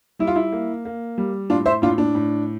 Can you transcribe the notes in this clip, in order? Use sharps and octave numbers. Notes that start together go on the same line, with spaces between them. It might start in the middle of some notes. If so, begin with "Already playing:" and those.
G3 E4
F4
E4
A#3
A#3
G3
A2 D4 F4
C5 E5
A2 D4 F4
D4
A2